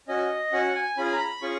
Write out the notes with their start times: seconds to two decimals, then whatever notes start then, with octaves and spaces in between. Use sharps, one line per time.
0.08 C#4 F#4 D#5
0.52 C#4 F#4 F#5
0.75 G#5
0.97 C#4 F4 G#4 B5
1.05 G#5
1.13 A#5
1.19 B5
1.41 C#4 F4 G#4 C#6